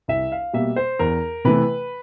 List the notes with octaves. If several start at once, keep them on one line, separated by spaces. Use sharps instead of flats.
C2 E5
F5
B2 G3 A#3 E5
C5
E2 A#4
C3 E3 A3 B4